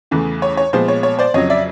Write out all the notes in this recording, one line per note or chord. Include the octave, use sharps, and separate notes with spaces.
E2 C#3 E3 A3
C#5
C#5
A#2 F3 G#3 B3 C5
C#5
C#5
C5 D5
F2 C#3 F#3 C#5 D#5
D5 E5